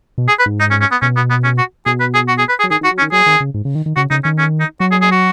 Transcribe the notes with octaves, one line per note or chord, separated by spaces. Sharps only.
B2
G#4
B4
G#2
D#4
C#4
C#4
B3
B2 C#4
B3
B3
C#4
F#4
B2 G#4
B4
G#4
F#4
G#4
B4
G#4
F#3
D#3 G#4
D#3
F#4
F#3
C#4
D#3
F#3 G#4
D#3
C#3
G#2
C#3
D#3
D#3
C#3 F#4
C#3 D#4
D#3 C#4
C#4
D#4
F#3 F#4
G#4
G#4
F#4